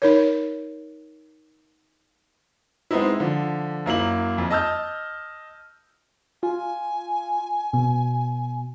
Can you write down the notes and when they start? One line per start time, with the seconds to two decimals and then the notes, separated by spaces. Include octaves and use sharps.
0.02 D#4 A#4 C#5
2.91 G#3 B3 C4 D#4 E4
3.20 D3 F3
3.86 F#2 A#3 E4 F#7
4.38 F2
4.50 D#5 A5 E6 F6 G6
6.43 F4 G#5
7.73 B2